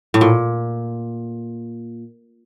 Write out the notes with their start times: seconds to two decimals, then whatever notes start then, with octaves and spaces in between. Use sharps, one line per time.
0.14 A2
0.21 A#2